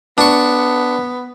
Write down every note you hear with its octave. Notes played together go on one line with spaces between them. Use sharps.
B3 D4 C#6